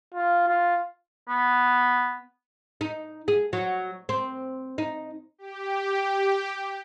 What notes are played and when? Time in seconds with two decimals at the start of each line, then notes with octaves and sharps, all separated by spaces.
0.14 F4
0.48 F4
1.28 B3
2.81 D#4
3.28 G#4
3.53 F#3
4.09 C4
4.78 D#4
5.38 G4